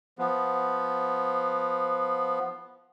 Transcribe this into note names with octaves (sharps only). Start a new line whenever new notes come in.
F3 B3